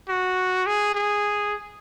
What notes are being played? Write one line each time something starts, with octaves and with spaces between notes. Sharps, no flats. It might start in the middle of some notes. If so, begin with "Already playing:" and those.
F#4
G#4
G#4